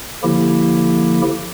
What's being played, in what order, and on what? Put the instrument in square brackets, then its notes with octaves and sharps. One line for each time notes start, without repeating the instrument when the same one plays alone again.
[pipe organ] D3 F3 A#3 E4 G4